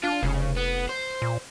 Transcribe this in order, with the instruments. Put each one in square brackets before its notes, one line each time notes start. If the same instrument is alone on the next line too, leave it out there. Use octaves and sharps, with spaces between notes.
[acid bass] D4 [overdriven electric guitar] F4
[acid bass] F1 [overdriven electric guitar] C#3
[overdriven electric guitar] B3
C5
[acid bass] A#2